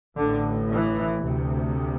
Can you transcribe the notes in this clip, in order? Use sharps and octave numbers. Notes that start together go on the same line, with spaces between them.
A1 A2 D3
E3
D2 C3